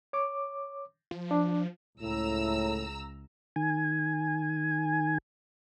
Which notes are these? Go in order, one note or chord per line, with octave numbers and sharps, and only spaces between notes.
C#5 D6
F3
D4
C#2 A2 A#5 E6
D#3 G#5